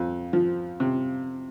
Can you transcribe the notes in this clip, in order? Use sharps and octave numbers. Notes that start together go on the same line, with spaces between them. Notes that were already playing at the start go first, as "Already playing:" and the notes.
Already playing: F2
F3
C3